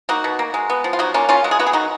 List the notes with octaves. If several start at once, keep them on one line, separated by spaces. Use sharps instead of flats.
A#3 D#4 F#4
B2
A#3
G#3
B3
F3
F4
F#3 D#4 F#4
A#3 C#4 F4
C#3 C#4 F4
G#3 F#4
G#4
B3 F#4
G#4
D#3 D#4 F#4